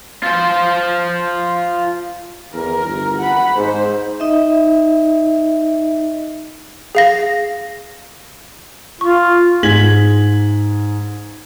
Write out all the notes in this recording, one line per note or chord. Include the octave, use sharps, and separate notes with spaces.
F4 C5
E2 A#4
G1
F#5 B5
G#2 C5
D#4 D#5 E5
G#4 F5 A#6
F4 C#6
G#2 G#4 G#6 B6 F#7